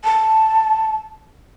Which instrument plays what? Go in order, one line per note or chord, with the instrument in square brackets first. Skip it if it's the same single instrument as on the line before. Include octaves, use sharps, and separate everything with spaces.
[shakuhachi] A5